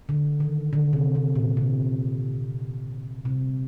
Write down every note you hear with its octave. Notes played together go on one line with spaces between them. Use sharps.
D3
D#3
D3
C3
C3
A#2
C3
C3